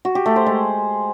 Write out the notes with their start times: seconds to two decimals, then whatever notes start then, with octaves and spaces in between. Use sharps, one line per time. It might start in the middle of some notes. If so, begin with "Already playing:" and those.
0.05 F#4
0.15 G4
0.26 A3
0.36 C5
0.46 G#3